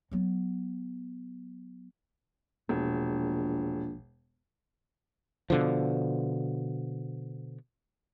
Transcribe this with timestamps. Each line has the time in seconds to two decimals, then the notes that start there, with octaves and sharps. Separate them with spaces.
0.11 F#3 B3
2.69 E1 A#1
5.50 B2 D3 F3